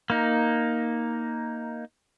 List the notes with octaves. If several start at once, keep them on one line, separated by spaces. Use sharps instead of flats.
A#3 D#4